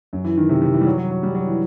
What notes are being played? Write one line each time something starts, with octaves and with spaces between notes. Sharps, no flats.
F#2
E3
D#3
C3
C3
E3
G3
F#3
F#3
F#3
G3
F#3
E3